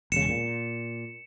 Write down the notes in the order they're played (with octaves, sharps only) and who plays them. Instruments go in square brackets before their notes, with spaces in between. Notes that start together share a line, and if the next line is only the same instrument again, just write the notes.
[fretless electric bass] E1 C#3 [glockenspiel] C#7 E7
[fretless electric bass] A#2